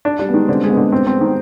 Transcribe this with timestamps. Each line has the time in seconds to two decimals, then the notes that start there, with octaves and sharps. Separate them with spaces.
0.05 D4
0.19 G3 D4
0.29 B3
0.33 D#3 G#3
0.48 D3 C4
0.63 G#3
0.70 B3
0.77 D3
0.92 C4
1.07 C4
1.21 D#3